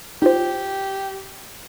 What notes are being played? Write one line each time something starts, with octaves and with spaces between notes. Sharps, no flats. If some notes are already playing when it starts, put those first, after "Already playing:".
D#4 F4 G4 C5